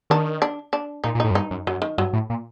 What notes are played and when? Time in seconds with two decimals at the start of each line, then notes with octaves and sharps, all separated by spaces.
0.10 D#3 D4
0.42 D4
0.73 D4
1.04 A#2 D#4
1.15 A#2
1.20 A2 D#4
1.31 F#2
1.35 G2 D#4
1.51 F#2
1.67 F#2 F#3
1.82 D#3
1.98 G2 F#3
2.13 A2
2.30 A#2